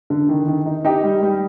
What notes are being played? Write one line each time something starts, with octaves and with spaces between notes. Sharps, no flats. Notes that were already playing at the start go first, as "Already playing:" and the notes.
D3
D#3
D#3
D#4
D#4 G4
G3
G3